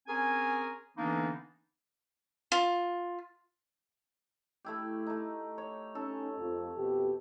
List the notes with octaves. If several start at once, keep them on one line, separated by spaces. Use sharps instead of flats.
C4 C#4 G#4 A#4 G#5
D3 E3 A#3 B3 D4 D#4
F4
A3 E4 G4
A3 D#4
C#5
C#4 D#4 A4
F2
F2 B2 G4